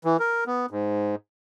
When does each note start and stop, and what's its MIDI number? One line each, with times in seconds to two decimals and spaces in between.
0.05 0.17 52
0.20 0.44 70
0.47 0.66 59
0.71 1.15 44